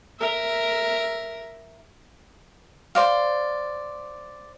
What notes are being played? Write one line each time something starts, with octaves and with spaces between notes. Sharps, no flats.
A#4 E5
C5 D5 F5